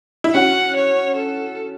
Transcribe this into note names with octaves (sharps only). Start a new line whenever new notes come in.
E4
C#4 F#4 F#5
C#5
A4